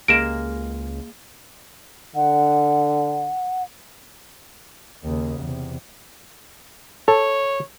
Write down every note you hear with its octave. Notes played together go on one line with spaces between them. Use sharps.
C#2 G#3 A#3 A#4 D7 E7
D3 F#5
D#2 C#3
E2 C3
A4 C#5